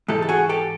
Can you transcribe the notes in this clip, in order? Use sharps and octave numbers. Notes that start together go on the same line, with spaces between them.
G#2 E3 G4 A4
A4
F#4 G#4
G4 A4